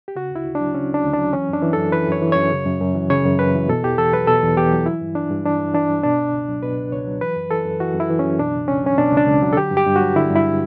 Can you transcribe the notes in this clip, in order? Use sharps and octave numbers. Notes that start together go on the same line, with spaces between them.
G4
C#3 F#4
D2 E4
D2
D4
F#3
C#3 C#4
D2 D4
D2
D4
F#3
E3 C#4
F#2 D4
E3
F#2 A4
E3 B4
F#2 C#5
E3
F#2 C#5
C#3
F#2
F#2
E3
C#3 C#5
F#2
F#2 B4
E3
B2 A4
E2 G4
E2 A4
F#3 B4
B2 A4
E2
E2 G4
F#3
E3 E4
G2
E3 D4
G2
E3 D4
G2
E3 D4
G2
B2 D4
C#2
C#2
F#3
B2 B4
C#2
C#2 C#5
F#3
E3 B4
F#2
E3 A4
F#2
E3 F#4
F#2
E4
E3
C#4
F#2
B2 D4
C#2
C#2 C#4
F#3 C#4
B2 D4
C#2
D4
C#2
F#3
A4
D3 G4
G2
G4
G2
F#4
F#3
D3 E4
G2
E4